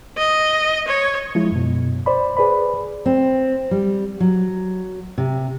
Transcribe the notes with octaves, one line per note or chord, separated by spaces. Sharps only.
D#5
C#5
F3 G#3 E4
F#2 B2
C5 D5 B5
G#4 B4 D5 B5
C4
G3
F#3
C3